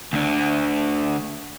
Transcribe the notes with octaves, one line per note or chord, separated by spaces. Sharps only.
D2 D3